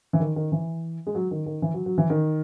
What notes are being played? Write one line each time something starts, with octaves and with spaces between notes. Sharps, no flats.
E3
D#3
D#3
E3
G#3
F#3
D#3
D#3
E3
F#3
F#3
E3
D#3